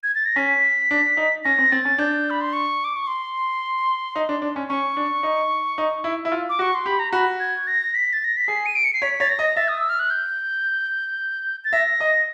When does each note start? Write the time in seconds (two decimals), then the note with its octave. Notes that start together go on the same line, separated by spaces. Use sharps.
0.03 G#6
0.15 A6
0.26 A#6
0.36 C#4 B6
0.91 D4
1.17 D#4
1.44 C#4 A#6
1.58 C4
1.72 C4 A6
1.85 C#4
1.98 D4 G6
2.30 B5
2.41 C6
2.53 C#6
2.84 D6
2.96 C#6
3.07 C6
4.16 D#4
4.29 D4
4.42 D4
4.56 C#4
4.69 C#4 C#6
4.97 D4
5.23 D#4
5.78 D#4
6.04 E4
6.25 E4
6.32 F4
6.49 D6
6.59 F#4 C#6
6.75 C6
6.86 G4 B5
6.99 A#5
7.13 F#4 B5
7.40 G#6
7.67 A#6
7.95 B6
8.13 A6
8.24 A#6
8.37 B6
8.48 G#4 C7
8.66 D#7
8.75 D7
8.85 C#7
8.94 C7
9.02 C#5 B6
9.20 C#5 A6
9.29 A#6
9.39 D#5
9.56 E5 A6
9.68 D#6
9.78 E6
9.89 F6
10.00 F#6
10.10 G6
11.65 A6
11.73 E5 A#6
12.00 D#5